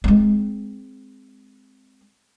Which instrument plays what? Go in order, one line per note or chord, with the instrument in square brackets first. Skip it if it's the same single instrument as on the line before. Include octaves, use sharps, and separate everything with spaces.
[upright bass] G#3 C4